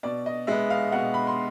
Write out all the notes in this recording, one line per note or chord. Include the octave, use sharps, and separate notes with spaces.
B2 D5
D#5
G#3 B3 E5
F5
B2 F#5
B5
C6